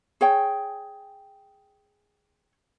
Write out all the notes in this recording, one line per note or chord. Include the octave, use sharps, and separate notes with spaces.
G#4 C#5 G5